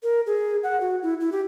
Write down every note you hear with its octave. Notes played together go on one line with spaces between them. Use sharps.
A#4
G#4
F#5
F#4
E4
E4
G4